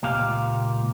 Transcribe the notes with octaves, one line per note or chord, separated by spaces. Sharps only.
C#2 A#2 G4 F5